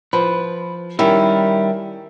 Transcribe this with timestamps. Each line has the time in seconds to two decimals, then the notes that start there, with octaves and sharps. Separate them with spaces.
0.13 F3 B4
0.99 D#3 G3 C#4 E4